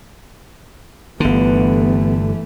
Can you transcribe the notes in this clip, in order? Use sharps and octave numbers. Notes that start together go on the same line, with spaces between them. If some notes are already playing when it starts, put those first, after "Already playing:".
G1 D3 E3 A3 B3